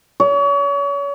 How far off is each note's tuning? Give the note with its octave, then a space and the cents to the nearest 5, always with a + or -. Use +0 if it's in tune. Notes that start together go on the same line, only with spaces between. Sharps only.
C#5 +35